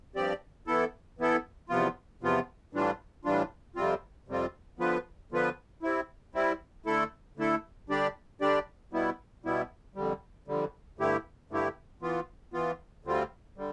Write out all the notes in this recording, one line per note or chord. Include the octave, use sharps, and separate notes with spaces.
G2 F3 C4 G4 D5
E3 B3 E4 A4
E3 B3 E4 A4
E2 C3 F3 B3 F4
E2 C3 F3 B3 F4
A2 E3 G3 D4 F4
A2 E3 G3 D4 F4
F2 C3 G3 C4 F4
F2 C3 G3 C4 F4
D3 F3 B3 F4 B4
D3 F3 B3 F4 B4
G3 C4 E4
G3 C4 E4
D3 A3 E4 A4
D3 A3 E4 A4
D3 G3 D4 G4 D5
D3 G3 D4 G4 D5
B2 G3 B3 E4
B2 G3 B3 E4
F2 D3 G3
F2 D3 G3
G2 D3 A3 E4 G4
G2 D3 A3 E4 G4
E3 B3 F4
E3 B3 F4
D2 D3 G3 C4 F4
D3 G3